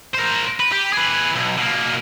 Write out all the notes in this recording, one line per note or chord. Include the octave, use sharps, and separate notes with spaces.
A#4 C5
B4
G4
G#4 B4
B1
B2 A#3